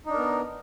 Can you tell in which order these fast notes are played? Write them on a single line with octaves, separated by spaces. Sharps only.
D#4 D4 A#4 B3